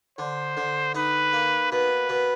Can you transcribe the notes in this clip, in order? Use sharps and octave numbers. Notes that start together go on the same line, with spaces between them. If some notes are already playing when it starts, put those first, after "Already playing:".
D3 C5
D3
D#4 B4
A#3
B2 B4
B2